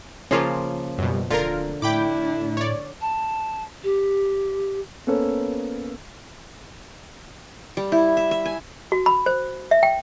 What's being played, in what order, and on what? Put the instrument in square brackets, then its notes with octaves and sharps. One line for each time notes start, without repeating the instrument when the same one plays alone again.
[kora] C#3 F3 A#3 [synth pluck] C#4 F4
[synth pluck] F#2 B2 [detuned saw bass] G3
[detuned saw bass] D1 [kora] D3 [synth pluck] F4 A#4
[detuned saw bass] A2 [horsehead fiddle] D4 E4 [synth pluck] G5 B5 D6
[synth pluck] C#5 D5
[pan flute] A5
G4
[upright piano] A#3 B3 C#4 A4 C5 C#5
[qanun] G3
E4
E5
E5
G#5
[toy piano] F#4
B5
C5
E5
G5